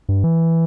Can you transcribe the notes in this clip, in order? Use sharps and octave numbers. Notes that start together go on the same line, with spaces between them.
G2
E3